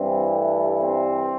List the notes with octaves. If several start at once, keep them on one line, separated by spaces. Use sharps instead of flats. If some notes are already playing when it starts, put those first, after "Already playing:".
Already playing: G2 E3 G3 C4
A3
C4